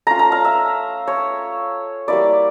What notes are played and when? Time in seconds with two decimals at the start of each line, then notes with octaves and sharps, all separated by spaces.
0.07 A3 C#4 F4 A#5
0.19 A#5
0.32 F5
0.45 E5
1.07 C#5
2.08 G3 A#3 E4 D5